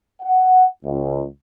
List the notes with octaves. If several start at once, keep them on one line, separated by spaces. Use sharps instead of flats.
F#5
C#2